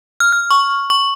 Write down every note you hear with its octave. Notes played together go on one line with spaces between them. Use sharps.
F6
F6
C#6
C#6